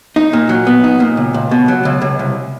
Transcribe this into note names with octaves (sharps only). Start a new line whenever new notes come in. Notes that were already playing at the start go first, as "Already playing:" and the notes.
D#4
A#2
F#3
B3
D#4
A#2
C#2
C#2
B2
F#3
C#2
C#2
C2